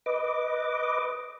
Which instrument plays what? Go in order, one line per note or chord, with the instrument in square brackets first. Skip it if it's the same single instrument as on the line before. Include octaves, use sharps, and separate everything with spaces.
[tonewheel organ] B4 D#5 D6